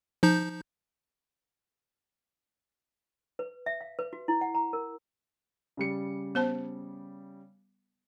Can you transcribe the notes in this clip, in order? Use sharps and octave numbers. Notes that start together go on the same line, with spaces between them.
F3 D#4 G6
B4
E5
F5
B4
F#4
E4
F#5
A#5
A#4
C#3 G3 C#7
B3 C5 A5